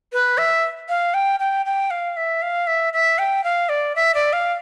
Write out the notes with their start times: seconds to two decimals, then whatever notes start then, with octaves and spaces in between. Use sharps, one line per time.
0.13 B4
0.38 E5
0.89 F5
1.14 G5
1.40 G5
1.66 G5
1.91 F5
2.17 E5
2.42 F5
2.67 E5
2.93 E5
3.19 G5
3.44 F5
3.69 D5
3.96 E5
4.15 D5
4.33 F5